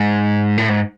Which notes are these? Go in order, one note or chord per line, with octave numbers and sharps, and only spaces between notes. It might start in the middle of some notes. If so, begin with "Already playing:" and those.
Already playing: G#2
A2
G#2